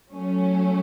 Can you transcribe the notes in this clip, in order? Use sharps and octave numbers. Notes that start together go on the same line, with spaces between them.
F#3 A3 C#4